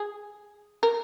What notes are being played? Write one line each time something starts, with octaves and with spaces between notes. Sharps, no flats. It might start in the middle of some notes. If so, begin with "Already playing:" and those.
Already playing: G#4
A#4